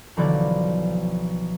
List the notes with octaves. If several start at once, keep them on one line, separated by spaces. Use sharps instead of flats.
B1 D3 E3 F3 D5